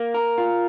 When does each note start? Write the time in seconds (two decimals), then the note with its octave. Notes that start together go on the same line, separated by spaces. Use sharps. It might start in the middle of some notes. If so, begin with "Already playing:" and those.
Already playing: A#3
0.14 A#4
0.38 F4